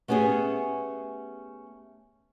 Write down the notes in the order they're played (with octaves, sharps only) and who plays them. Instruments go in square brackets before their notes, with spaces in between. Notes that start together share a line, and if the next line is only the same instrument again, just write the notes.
[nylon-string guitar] A3 B3 C#4 G4 G#4